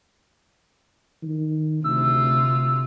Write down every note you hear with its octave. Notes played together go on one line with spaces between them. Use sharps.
D#3
D2 C3 F4 E6